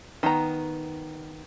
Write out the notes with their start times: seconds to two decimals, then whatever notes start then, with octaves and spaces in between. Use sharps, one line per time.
0.23 D#3 B3 A#5